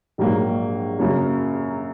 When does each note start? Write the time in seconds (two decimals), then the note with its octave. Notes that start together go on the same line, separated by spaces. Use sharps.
0.18 A#1 G#2 F#3 A#3
0.99 F#2 C#3 F#3 A#3